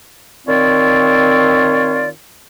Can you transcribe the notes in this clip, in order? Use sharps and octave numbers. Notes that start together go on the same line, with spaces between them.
D#3 C4 F4 C#5 D5